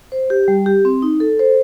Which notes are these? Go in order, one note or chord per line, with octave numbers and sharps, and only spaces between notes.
C5
G4
G3
G4
C4
D#4
A4
C5